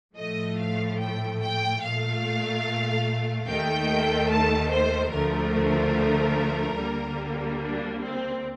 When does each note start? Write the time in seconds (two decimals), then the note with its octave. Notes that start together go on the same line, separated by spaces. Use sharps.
0.16 A2 F3 A3 D#5
0.58 F5
0.99 G5
1.40 G5
1.82 A#2 A3 F5
3.47 D#2 D#3 A3 G5
4.29 A5
4.70 C5
5.12 D2 D3 F3 A3 A#4
6.77 D2 D3 G3 A#3
7.60 D4
8.00 C4